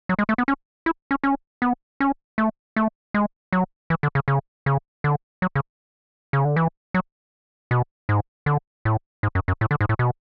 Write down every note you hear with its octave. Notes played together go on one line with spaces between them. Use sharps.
F#3
G#3
A3
B3
C#4
E4
C#4
C#4
B3
C#4
A3
A3
G#3
F#3
E3
D3
C#3
C#3
C#3
D3
F#3
C#3
C#3
D3
E3
F#3
B2
G#2
D3
A2
G#2
F#2
F#2
A2
D3
G#2
A2
B2